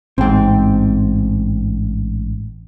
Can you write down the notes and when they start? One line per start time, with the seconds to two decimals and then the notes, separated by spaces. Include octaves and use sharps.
0.18 A1 G#2 C4 G5